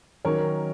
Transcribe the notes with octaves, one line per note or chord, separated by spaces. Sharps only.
D#3 F#3 C#4 A#4 C#5